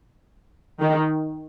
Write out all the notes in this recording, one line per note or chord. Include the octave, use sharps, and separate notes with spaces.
D#3